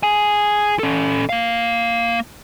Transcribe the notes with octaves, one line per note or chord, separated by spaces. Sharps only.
G#4 G#5
C#4 A4
A#3 F5